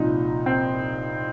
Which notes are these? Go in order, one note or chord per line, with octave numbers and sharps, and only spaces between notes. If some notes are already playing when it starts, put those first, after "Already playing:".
Already playing: C2 A#2 F3 D#4
C4